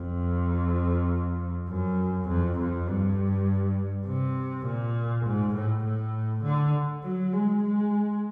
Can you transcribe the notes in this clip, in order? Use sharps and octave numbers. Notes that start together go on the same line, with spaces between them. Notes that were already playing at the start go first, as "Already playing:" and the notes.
Already playing: F2
F#2
F2
F2
G2
C3
A#2
G#2
A2
A2
D3
F#3
G#3
G#3